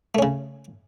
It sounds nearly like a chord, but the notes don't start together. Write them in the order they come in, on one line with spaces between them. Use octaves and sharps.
A3 C#4 C#3